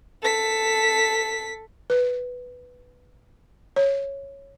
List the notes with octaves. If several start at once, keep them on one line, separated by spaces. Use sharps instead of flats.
A4 B6
B4
C#5